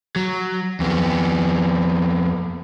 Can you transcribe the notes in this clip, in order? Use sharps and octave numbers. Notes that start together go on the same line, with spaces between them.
F#3
F2 B3